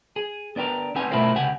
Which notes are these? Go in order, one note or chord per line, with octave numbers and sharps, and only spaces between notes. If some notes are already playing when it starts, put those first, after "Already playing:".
G#4
B3 D4 G4 A#4
B3 C4 D#4 G4 G#5
B2 A3 E4 F4 A#4 C5
C#2 C3 G4 F#5 G#5